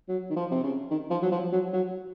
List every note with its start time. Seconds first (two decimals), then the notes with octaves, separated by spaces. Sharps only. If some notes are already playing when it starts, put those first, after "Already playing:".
0.09 F#3
0.30 D#3
0.36 F3
0.51 C3
0.63 C#3
0.91 D#3
1.10 F3
1.22 F#3
1.32 F3
1.52 F#3
1.73 F#3